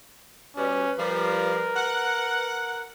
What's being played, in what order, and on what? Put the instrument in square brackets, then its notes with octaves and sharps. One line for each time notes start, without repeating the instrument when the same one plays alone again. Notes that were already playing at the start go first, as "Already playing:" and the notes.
[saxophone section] B2 G3 [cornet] C#4 [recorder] B4
[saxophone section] F3 G3 [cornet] A#4
[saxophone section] F#5